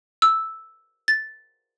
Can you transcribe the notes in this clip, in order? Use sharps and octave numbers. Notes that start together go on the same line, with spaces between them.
E6
A6